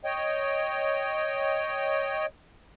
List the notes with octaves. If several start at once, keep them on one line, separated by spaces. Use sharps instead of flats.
C#5 D#5 G5